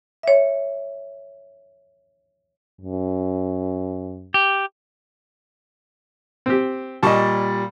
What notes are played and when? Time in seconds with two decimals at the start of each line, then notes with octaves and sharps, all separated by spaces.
0.23 C#5 E5
2.81 F#2
4.34 G4
6.46 C4 G4
7.03 A#2 G3 D#5 A5 C#6